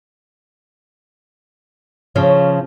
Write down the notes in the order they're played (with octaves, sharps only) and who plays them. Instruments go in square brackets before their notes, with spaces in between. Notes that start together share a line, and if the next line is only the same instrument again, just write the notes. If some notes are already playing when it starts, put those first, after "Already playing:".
[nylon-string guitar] C#3 F3 C#4 [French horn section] C#5